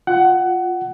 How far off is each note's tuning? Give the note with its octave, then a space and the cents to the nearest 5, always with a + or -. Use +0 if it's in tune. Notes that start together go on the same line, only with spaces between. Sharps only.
F4 +10 F#5 +20